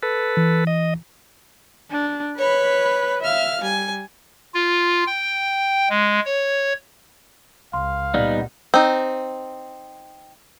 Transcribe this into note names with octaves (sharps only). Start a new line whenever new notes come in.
A4 B4
E3
D#5
D4
B4 C#5 B5
E5 F5 F6
G3 G#5
F4
G5
G#3
C#5
C#2 F5 C6
A#2 G3 B3 D#4 D5
C4 D#4